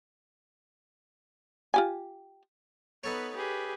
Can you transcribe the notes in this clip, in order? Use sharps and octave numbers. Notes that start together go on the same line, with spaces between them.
F4 G4 G#5
B3 D#4 A4 B4 C#5
G4 G#4 B4